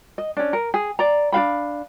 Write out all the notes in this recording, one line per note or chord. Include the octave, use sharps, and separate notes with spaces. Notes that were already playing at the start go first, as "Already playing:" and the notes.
D#5
C#4 D4
A#4
G#4
D5 A#5
D4 F#4 F5 B5